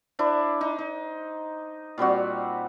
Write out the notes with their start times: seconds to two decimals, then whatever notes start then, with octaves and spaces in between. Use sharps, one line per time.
0.19 D4 E4 C5
0.61 D#4
0.79 D#4
1.98 A#2 G3 C4 F#4